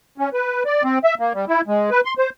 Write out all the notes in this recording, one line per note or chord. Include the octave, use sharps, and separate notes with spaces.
C#4
B4
D5
C4
E5
A#3
G3
E4
G#3
B4
C6
C5